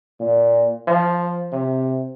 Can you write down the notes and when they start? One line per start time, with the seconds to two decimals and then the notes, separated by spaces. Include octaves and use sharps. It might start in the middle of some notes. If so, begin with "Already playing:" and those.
0.20 A#2
0.88 F3
1.52 C3